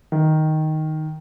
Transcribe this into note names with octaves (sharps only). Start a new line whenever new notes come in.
D#3